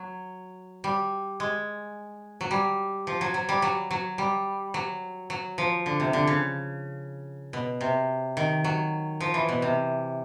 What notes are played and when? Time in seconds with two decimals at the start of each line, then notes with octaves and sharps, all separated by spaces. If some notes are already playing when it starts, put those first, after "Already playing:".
Already playing: F#3
0.84 G3
1.40 G#3
2.41 F#3
2.51 G3
3.07 F3
3.21 F#3
3.34 F#3
3.49 G3
3.62 F#3
3.91 F#3
4.18 G3
4.74 F#3
5.30 F#3
5.58 F3
5.86 D3
6.00 C3
6.13 D3
6.27 C#3
7.53 B2
7.81 C3
8.37 D#3
8.64 F#3
9.21 F3
9.34 E3
9.49 B2
9.62 C3